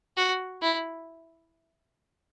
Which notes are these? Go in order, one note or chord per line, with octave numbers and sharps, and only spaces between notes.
F#4
E4